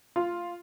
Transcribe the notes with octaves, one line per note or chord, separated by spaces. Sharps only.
F4